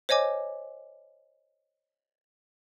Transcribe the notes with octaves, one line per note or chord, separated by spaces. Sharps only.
C5 C#5 D#5 G#5 D6